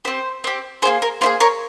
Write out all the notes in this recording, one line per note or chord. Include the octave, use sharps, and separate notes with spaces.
C4 G4 C5
C4 G4
A#3 E4 G#4 C5
A#4
A#3 E4 G#4 C5
A#4 C#5